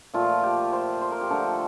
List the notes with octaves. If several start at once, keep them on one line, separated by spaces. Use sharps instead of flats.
A#2 F3 A3 F4
G4
C5
C5
A#4
G4
D3 F3 A3 A4